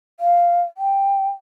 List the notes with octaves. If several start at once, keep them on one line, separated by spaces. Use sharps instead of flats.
F5
G5